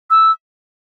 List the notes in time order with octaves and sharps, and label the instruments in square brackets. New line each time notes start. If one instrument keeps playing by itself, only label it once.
[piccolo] E6